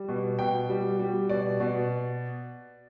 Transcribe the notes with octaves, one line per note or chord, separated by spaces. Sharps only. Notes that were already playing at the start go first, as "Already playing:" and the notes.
Already playing: G3
B2
B2 G5
G3
G3
B2 D5
B2